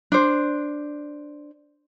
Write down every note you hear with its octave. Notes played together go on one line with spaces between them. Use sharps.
D4 C5